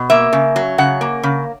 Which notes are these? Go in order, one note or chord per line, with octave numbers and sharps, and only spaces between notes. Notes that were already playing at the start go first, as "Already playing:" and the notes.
Already playing: B2
A#3 E5
C#3
F#3
C#3 F#5
A#3
C#3